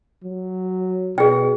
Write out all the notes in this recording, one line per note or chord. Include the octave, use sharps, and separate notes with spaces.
F#3
B2 G#4 G5